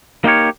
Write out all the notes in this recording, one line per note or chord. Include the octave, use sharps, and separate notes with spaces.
A#3 D#4 G4 A#4 C#5